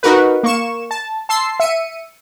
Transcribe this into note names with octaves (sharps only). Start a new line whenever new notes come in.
D#4 F#4 A#4 B4
A#3 C#6 E7
A5
A5 C6 E6 C7
E5 C#7 D#7